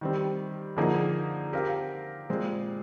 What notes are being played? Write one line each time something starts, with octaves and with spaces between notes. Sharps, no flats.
D#3 G3 C4
D3 F3 A#3 D#4 G#4
C4 G4 A#4 F5
A#2 G#3 C4